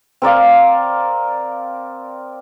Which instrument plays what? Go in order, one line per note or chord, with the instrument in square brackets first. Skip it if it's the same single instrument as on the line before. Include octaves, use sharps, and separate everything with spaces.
[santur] C4 A#4 D5 F5